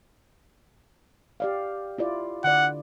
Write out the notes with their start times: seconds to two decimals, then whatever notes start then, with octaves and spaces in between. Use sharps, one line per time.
1.40 G4 D5 F5
1.98 E4 F4 D5
2.44 D3 D5 F#5